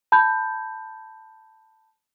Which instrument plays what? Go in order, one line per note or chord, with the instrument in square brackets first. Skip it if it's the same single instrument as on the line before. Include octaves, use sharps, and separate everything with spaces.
[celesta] A5 B5 G6